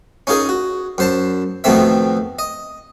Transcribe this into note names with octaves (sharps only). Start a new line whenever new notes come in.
C#4 D#4 F4 G#4 A#4
F#4
F#2 C5 A5
F2 B2 D#3 A3 C4 E5
D#5